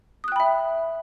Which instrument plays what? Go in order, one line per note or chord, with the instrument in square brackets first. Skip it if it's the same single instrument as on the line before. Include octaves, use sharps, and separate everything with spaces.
[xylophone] D#6
F#6
G5
B5
E5